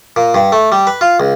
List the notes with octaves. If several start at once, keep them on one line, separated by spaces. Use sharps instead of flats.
A#2
G2
A3
G3
B4
F4
C#2